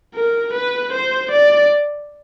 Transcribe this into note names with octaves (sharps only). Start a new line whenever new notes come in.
A#4
B4
C5
D5